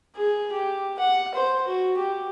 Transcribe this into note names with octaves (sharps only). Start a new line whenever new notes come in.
G#4
G4
F#5
C5
F#4
G4